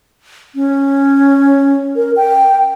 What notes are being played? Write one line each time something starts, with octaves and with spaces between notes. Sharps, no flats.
C#4
A#4
G5